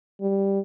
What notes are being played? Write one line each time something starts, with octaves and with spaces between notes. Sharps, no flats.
G3